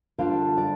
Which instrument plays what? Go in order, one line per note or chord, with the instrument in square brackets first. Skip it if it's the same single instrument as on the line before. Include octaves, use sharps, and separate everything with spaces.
[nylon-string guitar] D3 G3 D4 F4 F5
D5